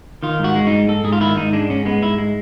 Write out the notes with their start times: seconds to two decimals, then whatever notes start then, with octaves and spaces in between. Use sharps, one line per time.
0.23 D#3 F4
0.40 G#2 F#4
0.55 G#3
0.67 D#4
0.72 G#2
0.88 G#2 A4
1.04 G#2 G#4
1.12 F4
1.21 D#3 E4
1.36 G#2 D#4
1.53 G#3 D4
1.70 G#2 C#4
1.86 G#3 B3
2.02 G#2 E4
2.19 G#3